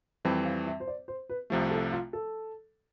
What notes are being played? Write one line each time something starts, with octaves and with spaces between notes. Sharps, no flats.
F2 E3 G3 C4 G5
F5
E5
C5
D5
C5
B4
C2 C3 F3 A3 A4
A4
F4
A4